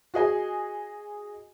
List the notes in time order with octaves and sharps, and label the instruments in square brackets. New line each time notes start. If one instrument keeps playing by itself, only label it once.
[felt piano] F#4 G#4 D#5 G#5